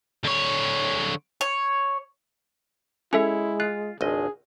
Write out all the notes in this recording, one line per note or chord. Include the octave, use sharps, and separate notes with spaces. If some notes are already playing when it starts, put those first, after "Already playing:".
D3 C#5
C#5
G#3 C#4 E4 A4 C#5 E5
F4 F#6
G#1 C#2 D4 G#4 D#5